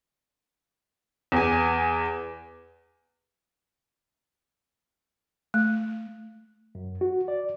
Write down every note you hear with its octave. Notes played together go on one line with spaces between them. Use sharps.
E2 G#5
A3
F#2
F#4
D5